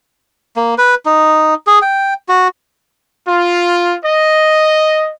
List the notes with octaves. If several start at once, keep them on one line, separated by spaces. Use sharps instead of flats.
A#3
B4
D#4
G#4
G5
F#4
F4
D#5